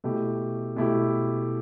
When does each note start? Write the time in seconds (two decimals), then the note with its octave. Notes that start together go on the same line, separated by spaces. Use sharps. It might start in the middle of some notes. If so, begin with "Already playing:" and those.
0.04 B2 A3 E4 G4
0.76 B2 A3 E4 G4